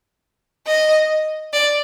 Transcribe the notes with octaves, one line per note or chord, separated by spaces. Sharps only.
D#5
D5